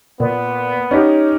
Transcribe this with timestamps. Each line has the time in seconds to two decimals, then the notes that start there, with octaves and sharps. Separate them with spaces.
0.20 A#2 B3
0.91 C#4 D#4 G4 C#5